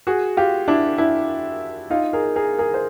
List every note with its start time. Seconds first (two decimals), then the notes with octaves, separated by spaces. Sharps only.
0.07 F#4 G#4
0.37 F4 G4
0.68 D4 E4
0.98 D4 E4
1.90 D#4 F4
2.13 G#4 A#4
2.36 G#4 A#4
2.58 G#4 A#4
2.74 C5